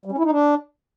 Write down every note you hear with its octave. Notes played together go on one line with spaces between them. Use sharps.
G3
C#4
E4
D#4
D4